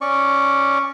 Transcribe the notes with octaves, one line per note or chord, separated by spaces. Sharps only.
C#4 D5 C#6